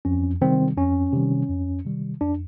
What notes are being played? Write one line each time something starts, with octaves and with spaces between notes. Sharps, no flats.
F2 C#4
C3 D#3 G3 C4
F2 C#4
C3 D#3 G3
F2
C3 D#3 G3
F2 D4